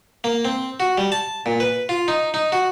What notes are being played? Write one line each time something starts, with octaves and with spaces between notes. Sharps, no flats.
A#3
C4
F#4
G3
A5
A#2
B4
F4
D#4
D#4
F#4